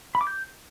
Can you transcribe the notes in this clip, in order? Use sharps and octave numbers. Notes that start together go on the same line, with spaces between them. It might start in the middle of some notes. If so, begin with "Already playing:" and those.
B5
D6
G6